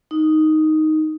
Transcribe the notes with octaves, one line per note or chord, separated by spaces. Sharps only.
D#4